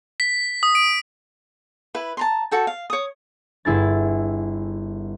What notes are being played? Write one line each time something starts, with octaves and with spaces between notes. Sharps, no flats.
B6
D#6
D7
E4 B4
A5 A#5 C6
F#4 A4 G5
F5
C#5 D#6
G1 E4 G#4 A6